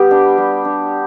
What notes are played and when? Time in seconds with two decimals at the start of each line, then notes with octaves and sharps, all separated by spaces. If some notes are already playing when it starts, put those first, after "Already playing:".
Already playing: G3 B3 G4
0.11 D4
0.38 G3
0.65 D4